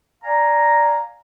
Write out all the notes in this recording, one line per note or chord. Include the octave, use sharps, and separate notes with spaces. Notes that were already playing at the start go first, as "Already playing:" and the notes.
D5 F5 G#5 A#5